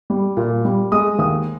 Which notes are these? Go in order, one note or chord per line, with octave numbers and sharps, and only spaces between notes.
G3
A#2
G3
G#3 D#6
D#2 D#6